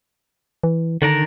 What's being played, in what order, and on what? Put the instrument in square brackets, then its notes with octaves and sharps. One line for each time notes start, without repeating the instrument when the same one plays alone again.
[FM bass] E3
[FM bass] D3 [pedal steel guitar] D#3 D4 A#4